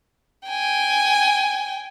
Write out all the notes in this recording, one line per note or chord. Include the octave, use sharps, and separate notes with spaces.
G5 G#5